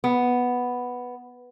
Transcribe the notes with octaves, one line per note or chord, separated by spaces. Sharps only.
B3